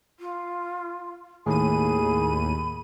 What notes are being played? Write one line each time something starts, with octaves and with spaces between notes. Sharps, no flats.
F4
D#2 A2 G#4 B5 D#7